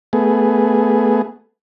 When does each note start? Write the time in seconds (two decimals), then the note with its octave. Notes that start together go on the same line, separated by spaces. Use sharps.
0.13 A3 B3 G#4